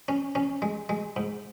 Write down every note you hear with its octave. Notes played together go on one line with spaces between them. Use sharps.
C#4
C#4
G#3
G#3
G#2